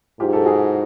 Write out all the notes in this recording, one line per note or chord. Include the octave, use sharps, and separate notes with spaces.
G#2 F4 G4
G4 A4
F#4 G#4